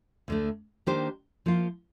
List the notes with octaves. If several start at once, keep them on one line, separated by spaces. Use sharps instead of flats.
D2 D3 A3
D#3 A#3 D4 G4 C5
F3 A#3 F4